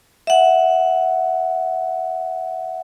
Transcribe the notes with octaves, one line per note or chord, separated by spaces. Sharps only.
E5 F#5